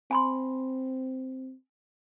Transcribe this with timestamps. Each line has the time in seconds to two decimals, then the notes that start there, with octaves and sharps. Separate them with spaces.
0.11 C4 G#5 B5 C6